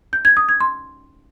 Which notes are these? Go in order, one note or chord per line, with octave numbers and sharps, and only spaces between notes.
G6
G#6
D#6
G#6
C6